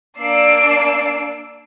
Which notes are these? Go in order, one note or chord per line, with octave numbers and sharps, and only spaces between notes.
A#3 D4 D5 E6 C7 D7